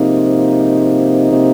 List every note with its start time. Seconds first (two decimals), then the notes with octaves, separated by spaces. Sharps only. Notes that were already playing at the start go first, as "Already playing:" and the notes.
Already playing: G#2 C3 F3 A#3 D#4
1.32 C3